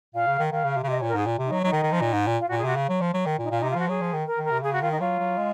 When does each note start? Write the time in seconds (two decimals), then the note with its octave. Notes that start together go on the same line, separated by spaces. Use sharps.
0.15 A#2 F5
0.27 C#3
0.39 D#3
0.51 D#3 F5
0.65 C#3
0.77 C3
0.83 C#3
0.88 C3 D#5
0.99 C#5
1.02 A#2
1.08 A#4
1.14 G#2 G#4
1.26 A#2
1.39 C3
1.45 D#4
1.52 F#3
1.64 F#3 D#4
1.73 D#3
1.83 D#3
1.92 F3
2.01 A#2
2.13 G#2
2.27 A#2
2.39 F4
2.48 A#2 F#4
2.58 G#4
2.64 C3 F#4
2.76 C#3
2.89 F#3
3.01 F3
3.14 F#3
3.26 D#3
3.39 A#2
3.43 D#4
3.51 A#2 F4
3.60 D#4
3.63 C3
3.70 F4
3.75 F3 F#4
3.88 F#3 G#4
4.01 F3
4.13 D#3
4.26 A#4
4.38 D#3
4.44 A#4
4.51 C3
4.62 C#3 G#4
4.73 F#4
4.82 D#3 F4
4.91 D#4
5.00 F#3 F4
5.19 F#3
5.37 G#3